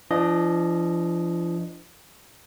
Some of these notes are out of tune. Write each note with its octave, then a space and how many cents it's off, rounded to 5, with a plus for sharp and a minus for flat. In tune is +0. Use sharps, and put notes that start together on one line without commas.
F3 -40 D4 +0 D#5 +0